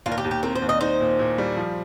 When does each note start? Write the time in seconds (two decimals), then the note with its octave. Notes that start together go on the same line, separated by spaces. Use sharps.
0.06 D#2 F4
0.12 A#4
0.18 G4
0.24 D#2
0.31 G4
0.43 C4 A#4
0.55 C5
0.62 D#2
0.69 D#5
0.81 D#4 C5
1.00 A#2
1.19 A#2
1.38 G3
1.57 F3